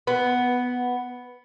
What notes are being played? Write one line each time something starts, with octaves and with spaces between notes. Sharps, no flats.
B3